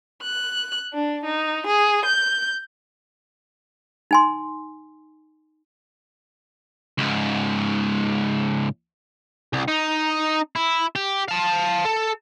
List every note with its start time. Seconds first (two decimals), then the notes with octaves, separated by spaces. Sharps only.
0.23 F#6
0.93 D4
1.25 D#4
1.67 G#4
2.05 G6
4.11 D#4 G#5 C6
6.98 C#2 G#2
9.53 C2
9.68 D#4
10.56 E4
10.96 G4
11.28 F5 A5
11.86 A4